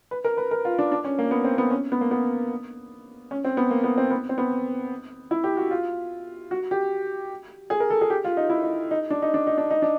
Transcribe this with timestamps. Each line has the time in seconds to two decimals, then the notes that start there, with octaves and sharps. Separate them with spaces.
0.11 B4
0.25 A#4
0.37 B4
0.51 A#4
0.65 F4
0.79 D4
0.92 D4
1.05 C#4
1.19 A#3
1.31 B3
1.44 C4
1.58 B3
1.71 C#4
1.92 B3
2.01 A#3
2.11 B3
3.31 C#4
3.44 C4
3.57 B3
3.70 A#3
3.84 B3
3.98 C4
4.10 B3
4.29 C4
4.38 B3
5.31 E4
5.44 G4
5.57 F#4
5.71 F4
6.51 F#4
6.71 G4
7.70 G#4
7.80 A#4
7.90 A4
8.01 G#4
8.10 G4
8.24 F4
8.37 D#4
8.50 E4
8.64 D#4
8.91 D#4
9.10 D4
9.22 D#4
9.34 D4
9.47 D#4
9.58 D4
9.71 D#4
9.82 D4